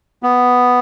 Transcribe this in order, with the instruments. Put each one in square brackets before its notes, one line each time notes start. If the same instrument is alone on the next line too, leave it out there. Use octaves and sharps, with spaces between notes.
[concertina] B3